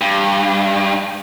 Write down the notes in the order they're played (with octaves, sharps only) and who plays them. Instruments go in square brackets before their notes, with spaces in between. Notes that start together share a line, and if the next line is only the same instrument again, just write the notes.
[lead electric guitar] G2